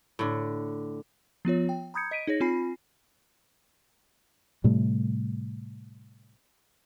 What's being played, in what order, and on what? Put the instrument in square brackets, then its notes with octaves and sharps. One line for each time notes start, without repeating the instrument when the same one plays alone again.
[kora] A2 D3
[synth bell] F3 B3 F4 C#5
G5
A#5 B5 D#6 G6 G#6 C#7
D#5 B6 D7 D#7
D#4 G#4 C#5 A#6
C4 F4 G#5 B5 C7
[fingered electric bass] A2 C3 G3 A3